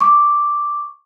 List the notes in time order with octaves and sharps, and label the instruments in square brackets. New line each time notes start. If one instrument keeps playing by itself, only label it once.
[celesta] C#6 D6